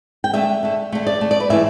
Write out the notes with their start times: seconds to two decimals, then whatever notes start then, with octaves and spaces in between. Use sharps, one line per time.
0.24 G5
0.34 D3 A3 E5
0.63 D3 A3
0.92 D3 A3
1.07 D5
1.21 D3 A3
1.31 D5
1.40 B4
1.50 A2 E3 A3 E5